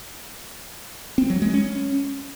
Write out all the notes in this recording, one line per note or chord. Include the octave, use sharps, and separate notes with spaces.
C4
F#3
G#3
C#4